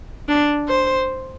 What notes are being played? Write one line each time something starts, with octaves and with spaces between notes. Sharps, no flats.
D4
C5